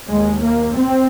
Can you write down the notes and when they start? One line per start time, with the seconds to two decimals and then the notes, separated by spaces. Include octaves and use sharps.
0.08 D#2 G#3
0.41 A#3
0.74 C4